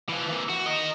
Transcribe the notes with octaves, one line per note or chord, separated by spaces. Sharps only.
E3 F3
E3 A#3
F#4
A#4 D#5